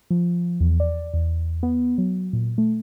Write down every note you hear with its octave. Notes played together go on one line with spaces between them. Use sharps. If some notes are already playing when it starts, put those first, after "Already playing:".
F3
E2
D5
E2
B3
F#3
A#2
A3